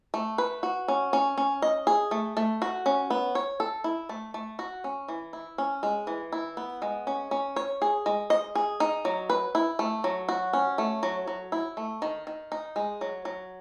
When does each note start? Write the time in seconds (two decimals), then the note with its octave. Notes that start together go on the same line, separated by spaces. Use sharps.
0.14 A3
0.38 B4
0.63 F#4
0.88 C#4
1.13 C#4
1.38 C#4
1.62 D#5
1.87 G#4
2.11 A3
2.37 A3
2.62 F#4
2.86 C#4
3.10 B3
3.35 C#5
3.60 A4
3.84 E4
4.09 A3
4.34 A3
4.59 F#4
4.84 C#4
5.08 E3
5.33 E4
5.58 C#4
5.83 G#3
6.07 E3
6.32 E4
6.57 B3
6.82 G#3
7.07 C#4
7.31 C#4
7.56 C#5
7.82 G#4
8.06 G#3
8.30 D#5
8.55 G#4
8.80 D#4
9.05 F#3
9.30 B4
9.55 E4
9.79 A3
10.04 F#3
10.29 F#4
10.53 C#4
10.78 A3
11.03 F#3
11.27 F#3
11.52 E4
11.77 A3
12.02 D#3
12.27 D#3
12.52 D#4
12.76 G#3
13.01 F#3
13.25 F#3